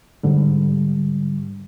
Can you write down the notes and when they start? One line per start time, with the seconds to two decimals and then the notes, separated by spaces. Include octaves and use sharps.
0.23 G#2 D3 G3